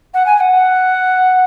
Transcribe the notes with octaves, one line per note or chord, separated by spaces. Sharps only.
F#5
G#5
G#5
F#5